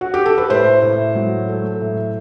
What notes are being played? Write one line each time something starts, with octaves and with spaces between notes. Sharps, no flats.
F#4
G4
A4
B4
A2 C5
A2
F#3
A3
A2